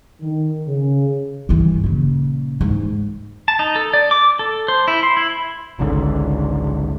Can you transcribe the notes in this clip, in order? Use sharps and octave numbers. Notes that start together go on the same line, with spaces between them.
D#3
C#3
G2 E3
A#2 C#3
E2 G#2
A5
D#4
A4
D5
D6
A4
C5
E4
C6
E4
G#1 C#2 G#2 D3